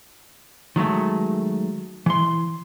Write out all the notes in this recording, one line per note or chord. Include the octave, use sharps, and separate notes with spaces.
D#3 F#3 G#3 A3
E3 C6